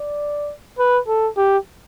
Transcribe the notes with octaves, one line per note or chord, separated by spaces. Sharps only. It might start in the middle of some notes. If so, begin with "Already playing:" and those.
Already playing: D5
B4
A4
G4